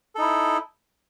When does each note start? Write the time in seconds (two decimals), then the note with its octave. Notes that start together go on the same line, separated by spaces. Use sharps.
0.15 A4
0.18 D#4
0.21 E4